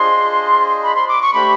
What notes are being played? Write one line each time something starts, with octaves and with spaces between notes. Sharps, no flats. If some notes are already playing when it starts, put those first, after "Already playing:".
Already playing: D4 F4 G#4 C5 D#5 C6
B5
C6
D6
C#6
A3 D4 G4 C5 B5